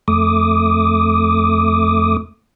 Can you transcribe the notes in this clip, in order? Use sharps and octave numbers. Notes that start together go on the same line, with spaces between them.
F2 A3 D6 D#6